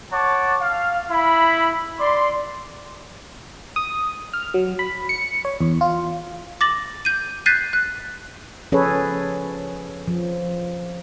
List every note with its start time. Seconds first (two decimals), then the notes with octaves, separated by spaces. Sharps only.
0.12 C#5 F#5 A5 D6
0.61 F5
1.10 E4 B5
1.99 D5 C6
3.76 D#6
4.33 F6
4.54 F#3
4.79 B5
5.09 C#7
5.45 C#5
5.60 E2
5.81 F4
6.61 D6 A6 A#6 F#7
7.05 G6 D#7
7.46 F#6 G6 A6 B6 C7 D#7
7.73 F#6
8.72 F3 C#4 G#4 A4 B4 C#5
10.07 F3